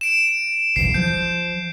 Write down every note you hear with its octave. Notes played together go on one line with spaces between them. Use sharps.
D7 E7
F#1 B1 E2 C7
F3 G6